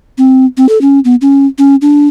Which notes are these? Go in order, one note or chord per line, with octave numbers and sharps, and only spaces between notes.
C4
C4
A4
C#4
B3
C#4
C#4
D4